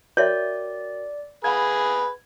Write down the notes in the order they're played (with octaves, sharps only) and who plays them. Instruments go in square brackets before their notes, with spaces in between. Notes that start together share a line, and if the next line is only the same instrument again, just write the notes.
[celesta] F#4 A#4 G5 [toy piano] C#5 E5 [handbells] D5
[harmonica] G#4 B4 [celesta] F5 F#5 B5 [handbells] G#6